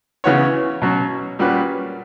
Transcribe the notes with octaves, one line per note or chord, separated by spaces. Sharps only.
C#3 E3 B3 F#4 C#5
B2 F#3 C#4
A#2 G3 C#4 F#4 B4